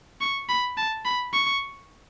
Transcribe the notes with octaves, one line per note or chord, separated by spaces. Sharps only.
C#6
B5
A5
B5
C#6